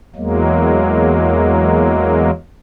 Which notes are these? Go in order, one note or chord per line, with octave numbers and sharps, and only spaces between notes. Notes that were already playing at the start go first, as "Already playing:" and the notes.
E2 F#3 G#3 A#3